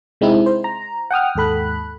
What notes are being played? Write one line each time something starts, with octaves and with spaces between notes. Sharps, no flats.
C3 G#3 C4 D#4 E4
C5
A#5
F#5 G5 D#6 F6
D#2 G#2 A4 B5 F#6